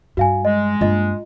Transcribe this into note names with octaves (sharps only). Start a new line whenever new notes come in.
G2 F#4 F5 G#5
G#3 D#5
G2 A#3 F4 D#5